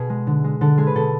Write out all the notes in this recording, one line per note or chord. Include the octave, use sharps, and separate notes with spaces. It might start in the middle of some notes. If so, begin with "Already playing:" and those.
Already playing: B2 G#4
G#3
D3
G#3
D3 A4
G#3 G#4
B4
B2 A4